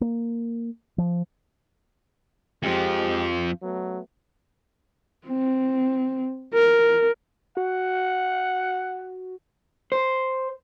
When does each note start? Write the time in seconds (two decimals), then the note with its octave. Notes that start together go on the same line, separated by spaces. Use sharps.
0.01 A#3
0.98 F3
2.63 F2 F3 G#3 G4
3.62 F#3 A3 B3
5.27 C4
6.54 A#4
7.57 F#4 F#5
9.92 C5